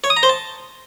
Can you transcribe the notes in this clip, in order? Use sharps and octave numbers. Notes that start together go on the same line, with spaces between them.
C#5
D#6
A#5
C5
A5